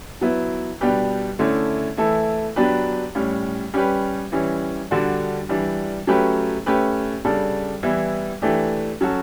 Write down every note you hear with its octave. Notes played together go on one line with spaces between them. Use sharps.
F#3 B3 E4
B2 G3 D4 G4 B4
D3 A3 C#4 E4
E3 A3 E4 A4
F#3 B3 D4 G4 B4
A2 G3 C#4
G3 C#4 G4 B4
E3 G3 C#4
D3 G3 D4 F#4
E3 G3 D4
F#3 A3 C#4 G4 B4
A3 C#4 G4 B4
C#3 G3 D4 A4
E3 G3 B3 E4
E3 A3 D4 G4
F#3 C#4 F#4 A4